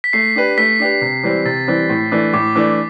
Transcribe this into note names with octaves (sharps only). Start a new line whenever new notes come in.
B6
A3 C7
D4 G4 B4
A3 B6
D4 G4 B4
C3
E3 G3 C4
C3 A6
E3 G3 C4
A2
E3 A3 D4
A2 D6
E3 A3 D4